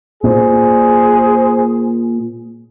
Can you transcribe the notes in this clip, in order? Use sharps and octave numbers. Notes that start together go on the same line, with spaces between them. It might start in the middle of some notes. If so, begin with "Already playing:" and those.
A#2 G#4 C5